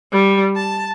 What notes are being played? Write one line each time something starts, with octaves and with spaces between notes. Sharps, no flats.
G3
A5